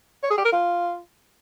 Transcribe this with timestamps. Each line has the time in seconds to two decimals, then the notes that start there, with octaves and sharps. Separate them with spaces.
0.23 C#5
0.30 G#4
0.38 G4
0.45 A#4
0.52 F4